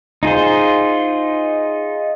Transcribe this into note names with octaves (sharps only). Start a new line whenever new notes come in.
D#4 F4 G#4 C5